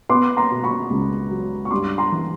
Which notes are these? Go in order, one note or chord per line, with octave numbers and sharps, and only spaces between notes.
B3 C6 D6
A#5 C6
B2
B5 C#6
C#2
F#3
C#6
G2 C6 D6
A#5 C6
E3